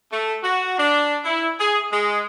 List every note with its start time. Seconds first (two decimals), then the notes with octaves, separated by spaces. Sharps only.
0.12 A3
0.43 F#4
0.78 D4
1.24 E4
1.59 G#4
1.91 G#3